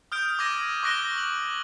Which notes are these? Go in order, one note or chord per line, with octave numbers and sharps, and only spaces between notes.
D#6 F6 G6 D7
D6 E6 G#6 A#6 D#7
C#6 D6 F#6 A#6 D7 G7
F#7